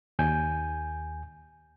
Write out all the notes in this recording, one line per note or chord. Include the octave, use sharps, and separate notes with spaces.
D#2 G#5 G6